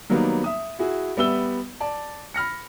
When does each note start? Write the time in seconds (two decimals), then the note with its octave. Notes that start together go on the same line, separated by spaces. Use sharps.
0.10 D#3 F#3 G3 A#3 B3 D#4
0.44 E5 D#6
0.79 E4 F#4 G#4
1.17 G3 B3 E5 E6 G7
1.80 D5 A5
2.34 B5 F6 A#6 C#7